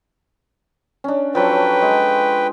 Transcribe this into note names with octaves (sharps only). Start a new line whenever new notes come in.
C#4 D4
F3 F#3 A4 B4 G5
G#3